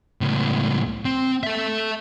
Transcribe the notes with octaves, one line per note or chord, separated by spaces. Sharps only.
C#2 A2
C4
A4 E5